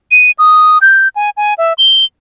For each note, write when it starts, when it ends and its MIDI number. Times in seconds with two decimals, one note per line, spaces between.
0.11 0.31 99
0.39 0.78 87
0.82 1.08 91
1.16 1.30 80
1.37 1.54 80
1.58 1.73 76
1.78 2.05 103